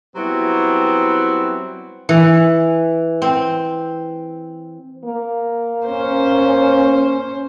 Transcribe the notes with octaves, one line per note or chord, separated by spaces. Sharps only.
F#3 G3 B3 C4 E4 F#4
E3
C4
A#3
C#4 C5